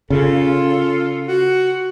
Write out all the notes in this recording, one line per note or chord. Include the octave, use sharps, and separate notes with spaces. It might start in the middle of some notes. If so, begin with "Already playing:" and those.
C#3 F4 A4
F#4